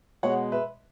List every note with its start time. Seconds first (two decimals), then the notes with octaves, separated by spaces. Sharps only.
0.23 B2 G#3 C#5 F#5
0.52 B4 E5